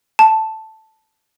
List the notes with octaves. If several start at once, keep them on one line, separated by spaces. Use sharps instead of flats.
A5